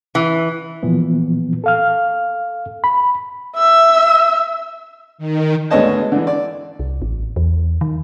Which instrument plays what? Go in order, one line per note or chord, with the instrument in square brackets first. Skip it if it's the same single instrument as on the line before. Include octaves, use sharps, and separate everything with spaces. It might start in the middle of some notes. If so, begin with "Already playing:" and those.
[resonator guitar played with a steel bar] E3
[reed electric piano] A#2 E3 F3 B3
A4 F5 F6
B5
[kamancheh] E5 E6
[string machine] D#3
[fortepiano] D2 G#3 B3 C#5 D#5 A5
D3 E3
D5
[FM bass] C2
A1
E2
D#3